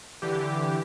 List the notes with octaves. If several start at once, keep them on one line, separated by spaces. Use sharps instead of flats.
D3 E3 G4